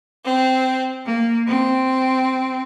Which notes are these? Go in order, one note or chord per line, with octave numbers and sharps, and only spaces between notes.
C4
A#3
C4